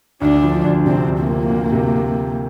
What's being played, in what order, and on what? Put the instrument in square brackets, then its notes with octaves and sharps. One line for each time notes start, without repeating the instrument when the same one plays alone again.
[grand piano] D2 [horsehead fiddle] D4
[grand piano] F3
D2
[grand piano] C3 [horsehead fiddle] C4
[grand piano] D2
[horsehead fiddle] A#3
[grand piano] F3
D2
C3